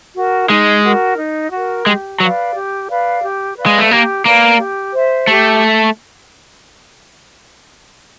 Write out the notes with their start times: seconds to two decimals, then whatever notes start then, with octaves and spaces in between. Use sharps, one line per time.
0.16 F#4 A#4
0.49 G#3 D#4
0.84 F#4 A#4
1.18 D#4
1.52 F#4 A#4
1.86 G#3 G4
2.20 F#3 B4 D5 F5
2.54 G4
2.89 B4 D5 F5
3.23 G4
3.57 B4 D5 F5
3.66 G#3
3.78 A3
3.91 A#3 G4
4.26 A#3 B4 D5 F5
4.59 G4
4.93 C5 E5
5.27 A3 G4